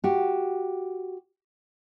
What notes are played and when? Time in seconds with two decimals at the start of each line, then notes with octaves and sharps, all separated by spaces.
0.04 F#4 G4